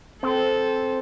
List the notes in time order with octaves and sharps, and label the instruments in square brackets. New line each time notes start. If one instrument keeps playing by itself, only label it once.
[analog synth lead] C4 [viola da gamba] A4